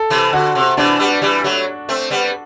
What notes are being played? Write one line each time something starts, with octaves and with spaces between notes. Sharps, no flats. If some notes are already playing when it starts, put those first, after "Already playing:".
Already playing: A4
C3 E3
D3 F#4
C3
C3 E3 D4
G3 B3
E3 G3
F#3 A3
A3 C4
G3 B3